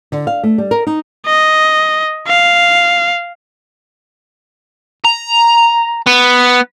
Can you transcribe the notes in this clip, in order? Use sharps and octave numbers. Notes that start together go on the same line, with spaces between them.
D3
F5
A3
G3
A#4
D#4
D#5
F5
A#5
B3